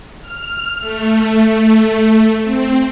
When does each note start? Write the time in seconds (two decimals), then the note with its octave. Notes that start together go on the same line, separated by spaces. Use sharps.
0.21 F6
0.79 A3
2.43 C4